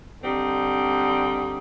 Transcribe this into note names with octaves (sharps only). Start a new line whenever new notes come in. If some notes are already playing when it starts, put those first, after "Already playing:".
D3 G3 C4 D#4